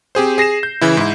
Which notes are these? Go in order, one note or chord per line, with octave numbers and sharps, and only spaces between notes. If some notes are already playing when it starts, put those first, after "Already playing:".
C4 G4 G#4 C5
G#4 A#6 C7 E7
G6
C#3 E3 E4
G#2 E4